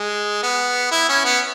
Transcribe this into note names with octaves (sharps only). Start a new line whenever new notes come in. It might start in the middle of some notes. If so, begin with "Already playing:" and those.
Already playing: G#3
B3
E4
C#4
B3